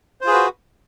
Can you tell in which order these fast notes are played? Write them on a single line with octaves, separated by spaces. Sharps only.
C5 F4 G#4 B4 F#4